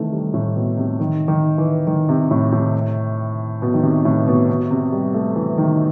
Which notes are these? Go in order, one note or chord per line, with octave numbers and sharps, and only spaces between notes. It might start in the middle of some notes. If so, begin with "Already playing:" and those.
Already playing: C3 D#3 E3 A3
G3
A2
B2
C3
D#3
D#3
E3
D#3
C3
A2
A2
B2
D#3
C3
A2
B2
B2
C3
G3
A3
E3
D#3